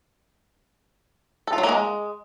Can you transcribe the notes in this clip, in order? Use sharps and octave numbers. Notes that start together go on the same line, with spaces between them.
A4
F4
F#3
A#3
G#3